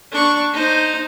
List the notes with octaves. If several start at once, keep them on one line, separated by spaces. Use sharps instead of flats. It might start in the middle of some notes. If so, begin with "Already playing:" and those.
D4 C#6
D#4 C5